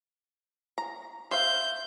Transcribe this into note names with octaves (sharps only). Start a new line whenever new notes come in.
A#5
C5 E5 F5 G6